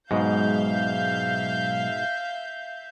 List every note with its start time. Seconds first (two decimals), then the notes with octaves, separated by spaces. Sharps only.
0.11 B1 G#2 B2 G#3 E5 F5 G6